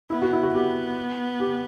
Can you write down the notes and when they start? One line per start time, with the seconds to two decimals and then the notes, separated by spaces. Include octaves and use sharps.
0.10 B3 E4
0.22 F#4
0.33 E4
0.43 F#4
0.54 B3 G4
1.40 G4